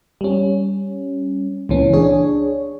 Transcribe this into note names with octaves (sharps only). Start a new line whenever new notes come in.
G3 C#4
C#2 A#2 E3 C#4
D4 G#4 C#5